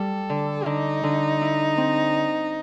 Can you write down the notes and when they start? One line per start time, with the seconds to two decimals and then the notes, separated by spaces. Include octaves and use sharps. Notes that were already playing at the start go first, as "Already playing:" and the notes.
Already playing: G3 A4
0.29 D3
0.66 D3 D#4
1.03 D3
1.41 E4
1.77 C4